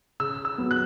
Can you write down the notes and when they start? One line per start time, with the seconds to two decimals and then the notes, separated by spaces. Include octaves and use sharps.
0.20 C#3 E6
0.45 E6
0.58 F#3 B3
0.71 F#6